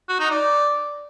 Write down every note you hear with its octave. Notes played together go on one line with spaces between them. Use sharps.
F#4
D#4
D5